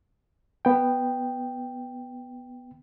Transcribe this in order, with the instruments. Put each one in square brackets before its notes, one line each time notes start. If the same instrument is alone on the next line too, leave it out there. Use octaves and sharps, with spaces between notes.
[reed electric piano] B3 G5